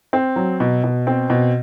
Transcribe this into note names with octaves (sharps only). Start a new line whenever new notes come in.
C4
F#3
B2
B2
C4
B2